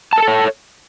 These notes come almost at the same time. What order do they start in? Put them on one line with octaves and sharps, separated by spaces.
A5 A#4 A4 C#5